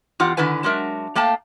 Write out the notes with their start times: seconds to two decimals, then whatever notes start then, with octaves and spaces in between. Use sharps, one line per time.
0.20 E2 F4 G4 F#5
0.37 D3 D#3 E4 B4 G#5
0.63 F#3 G#3 D4 A#4 E5
1.15 A3 A#3 F5 G5 A5